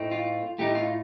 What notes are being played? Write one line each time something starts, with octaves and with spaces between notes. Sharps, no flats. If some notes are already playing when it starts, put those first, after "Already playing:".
Already playing: A2 A3 C4 D#4
F4
A2 A3 D#4 G4
F4